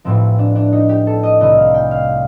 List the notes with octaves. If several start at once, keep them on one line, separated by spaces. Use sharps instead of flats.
A1 A2 F3 C4
D4
D4
D#4
G4
A4
D#5
C2 C3 D#3 D#5
F5
G5
F5